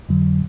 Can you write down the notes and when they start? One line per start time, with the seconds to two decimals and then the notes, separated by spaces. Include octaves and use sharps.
0.09 F2 D3 F#3